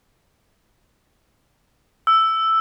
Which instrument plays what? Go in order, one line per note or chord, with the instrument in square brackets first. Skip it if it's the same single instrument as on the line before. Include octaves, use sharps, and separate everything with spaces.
[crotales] E6